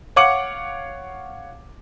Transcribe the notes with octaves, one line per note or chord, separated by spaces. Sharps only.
C#5 F5 F#5 D6 C#7 F#7